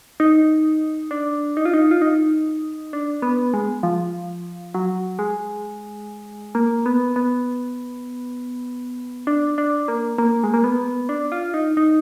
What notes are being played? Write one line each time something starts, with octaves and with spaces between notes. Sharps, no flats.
D#4
D4
D#4
F4
D#4
F4
D#4
D4
B3
G#3
F3
F#3
G#3
A#3
B3
B3
D4
D4
A#3
A#3
G#3
A#3
B3
D4
F4
D#4
D#4